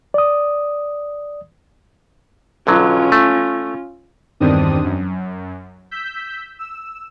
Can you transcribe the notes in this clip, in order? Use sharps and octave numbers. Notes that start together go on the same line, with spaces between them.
D5 D#6
B1 D3 F#3 C#4 F4
A3
E2 G2 D#3 C4 D4 D#6
F#2
E6 G6 B6
E6